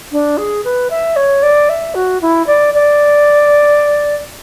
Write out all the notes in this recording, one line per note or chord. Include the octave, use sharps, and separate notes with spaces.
D4
G#4
B4
E5
C#5
D5
E5
F#4
E4
D5
D5